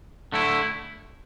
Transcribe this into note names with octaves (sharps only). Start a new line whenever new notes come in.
D3 A3 E4